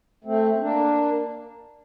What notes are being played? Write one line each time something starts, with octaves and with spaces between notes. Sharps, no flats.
A3 C4
A#3 D4